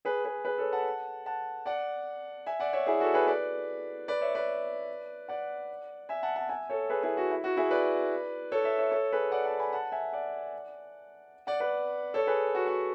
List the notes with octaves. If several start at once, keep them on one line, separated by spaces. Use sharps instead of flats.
G#4 B4
G#4 B4
G#4 B4
A4 C#5
F#5 A5
F#5 A5
D5 F#5
E5 G#5
D5 F#5
C#5 E5
E4 G#4
F#4 A4
G#4 B4
B4 D5
B4 D5
C#5 E5
B4 D5
D5 F#5
E5 G#5
F#5 A5
F#5 A5
E5 G#5
A4 C#5
G#4 B4
E4 G#4
F#4
E4
F#4
E4 G#4
B4 D5
A4 C#5
C#5 E5
C#5 E5
A4 C#5
G#4 B4
D5 F#5
F#5 A5
G#5 B5
F#5 A5
E5 G#5
D5 F#5
D5 F#5
B4 D5
A4 C#5
G#4 B4
F#4
F#4